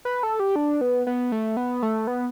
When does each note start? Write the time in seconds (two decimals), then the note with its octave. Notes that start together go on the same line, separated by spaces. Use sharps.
0.05 B4
0.23 A4
0.40 G4
0.56 D4
0.81 B3
1.07 B3
1.32 A3
1.57 B3
1.82 A3
2.07 B3